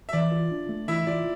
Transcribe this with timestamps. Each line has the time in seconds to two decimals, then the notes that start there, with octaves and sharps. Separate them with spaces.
0.09 E5
0.13 E3 D5
0.32 F4
0.51 D4
0.69 A3
0.88 E3 E4 E5
1.07 F4 D5